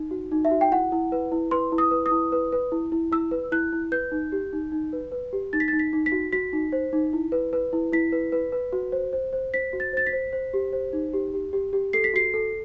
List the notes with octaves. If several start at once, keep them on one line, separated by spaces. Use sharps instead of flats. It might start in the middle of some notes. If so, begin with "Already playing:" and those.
Already playing: D#4
F#4
D#4
E5
F#4
G5
E4 F#5
E4
B4
E4
B4 C6
E4
D#6
B4
D#6
E4
B4
B4
E4
E4
E4 E6
B4
E4 F#6
E4
B4 G6
D#4
G4
D#4
D#4
B4
B4
G4
D#4 A6
B6
A6
D#4
B6
D#4
B6
F#4
F#4 B6
D#4
C5
D#4
E4
B4
B4
E4
E4 B6
B4
B4
B4
F#4
C5
C5
C5
C5 B6
F#4
A6
C5 A6
B6
C5
C5
G4
C5
D#4
G4
G4
G4
G4
A4 C7
B6
F#4 C7
A4